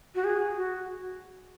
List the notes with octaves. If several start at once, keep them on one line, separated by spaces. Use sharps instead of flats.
F#4
G#4
F#4